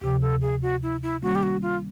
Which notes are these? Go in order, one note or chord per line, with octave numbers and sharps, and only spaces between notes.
D2 C3 F3 G4
A4
G#4
F#4
E4
E4
D#3 G3 A#3 C#4 F#4
G4
F#4
F4